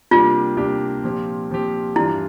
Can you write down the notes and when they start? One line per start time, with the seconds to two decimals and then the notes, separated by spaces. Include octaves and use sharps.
0.11 C3 G3 A#3 D4 F4 G4
0.57 C3 G3 A#3 D4 G4
1.04 A#2 F3 C4 G4
1.50 A#2 F3 C4 G4
1.96 G2 E3 G3 D4 E4 F4